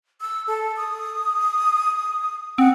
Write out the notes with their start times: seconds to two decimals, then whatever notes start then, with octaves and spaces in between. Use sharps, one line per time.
0.21 E6
0.47 A4
0.77 D#6
2.58 C4 F#5